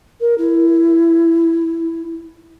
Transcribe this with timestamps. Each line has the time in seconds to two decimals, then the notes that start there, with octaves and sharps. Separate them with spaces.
0.20 A#4
0.38 E4